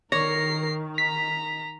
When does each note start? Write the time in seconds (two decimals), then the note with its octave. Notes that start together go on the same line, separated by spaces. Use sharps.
0.12 D#3 A#4 C#5 A#6 C7
0.98 A#5 B6